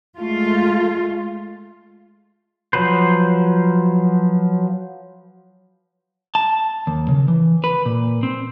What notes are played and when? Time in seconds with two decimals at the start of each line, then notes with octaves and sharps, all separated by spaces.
0.19 G#3 A3 F4
2.73 F3 F#3 B4 C5
6.35 A5
6.87 D#2
7.08 C#3
7.28 E3
7.64 B4
7.86 A#2
8.23 C4